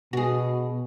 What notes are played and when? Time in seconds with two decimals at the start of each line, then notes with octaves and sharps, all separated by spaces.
0.13 B2 F#4 G#4